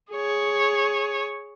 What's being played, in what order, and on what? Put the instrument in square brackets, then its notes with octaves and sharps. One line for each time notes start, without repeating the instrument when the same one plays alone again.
[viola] G#4 C#5